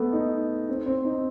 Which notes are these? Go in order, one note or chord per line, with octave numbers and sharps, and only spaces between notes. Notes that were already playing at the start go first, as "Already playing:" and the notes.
Already playing: A3 B3
D#4
C4
C4
D#4